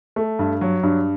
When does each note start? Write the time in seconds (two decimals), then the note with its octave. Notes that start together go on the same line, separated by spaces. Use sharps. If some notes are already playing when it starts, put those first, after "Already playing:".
0.16 A3
0.39 G2
0.61 F#3
0.83 G2